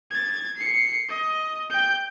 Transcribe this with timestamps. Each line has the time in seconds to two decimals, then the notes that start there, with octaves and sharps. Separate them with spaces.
0.11 G#6 A6
0.57 C7 C#7
1.09 D#5
1.70 G5 G6